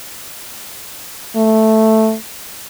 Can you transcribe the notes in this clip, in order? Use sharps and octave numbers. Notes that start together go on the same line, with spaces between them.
A3